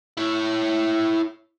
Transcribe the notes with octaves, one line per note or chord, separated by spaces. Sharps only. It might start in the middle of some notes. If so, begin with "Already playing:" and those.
E4 C#5